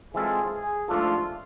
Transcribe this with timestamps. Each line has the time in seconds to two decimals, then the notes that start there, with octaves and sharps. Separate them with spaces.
0.14 E3 G#3 C4 F4 G#4 A4
0.52 G#4
0.88 G#2 F3 A3 D4 F4 A4